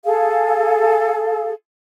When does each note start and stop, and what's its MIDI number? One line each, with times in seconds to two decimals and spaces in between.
0.05 1.51 68
0.05 1.51 69
0.05 1.51 77